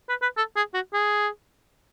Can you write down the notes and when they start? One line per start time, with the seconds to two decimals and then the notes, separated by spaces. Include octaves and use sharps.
0.09 B4
0.22 B4
0.37 A4
0.56 G#4
0.74 F#4
0.93 G#4